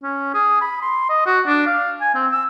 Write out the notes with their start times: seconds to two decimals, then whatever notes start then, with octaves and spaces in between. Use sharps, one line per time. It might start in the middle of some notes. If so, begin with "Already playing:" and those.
0.03 C#4
0.34 G#4
0.61 B5
0.82 C6
1.09 D#5
1.26 F#4
1.47 D4
1.66 F5
2.01 G#5
2.14 C4
2.32 E6